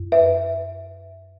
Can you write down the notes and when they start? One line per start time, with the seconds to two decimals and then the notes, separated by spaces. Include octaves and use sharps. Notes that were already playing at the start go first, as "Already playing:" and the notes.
Already playing: F#2
0.12 B4 E5